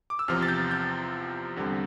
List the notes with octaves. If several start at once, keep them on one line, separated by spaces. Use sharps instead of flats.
D6
E6
E2 C3 F3 C4 F6
A6
G6
G6
E2 D3 G3 C4